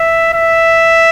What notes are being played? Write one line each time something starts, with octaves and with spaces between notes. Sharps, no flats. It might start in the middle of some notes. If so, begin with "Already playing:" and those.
Already playing: E5
E5